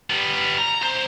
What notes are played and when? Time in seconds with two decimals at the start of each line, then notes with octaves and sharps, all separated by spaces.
0.10 G3 B3
0.58 A#5
0.81 C2 C5